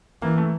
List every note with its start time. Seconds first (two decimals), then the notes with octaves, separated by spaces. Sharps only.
0.22 E3 A#3
0.38 A3